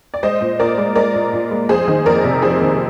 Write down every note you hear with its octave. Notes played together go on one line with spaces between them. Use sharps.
D5
G#3 C5 D#5
A#2
A#2 A#4 D5
G#3
G#3 A#4 D5
A#2
A#2
G#3
F2 G#4 C5
D#3
F2 A#4 D5
C3
F2 G#4 C5
D#3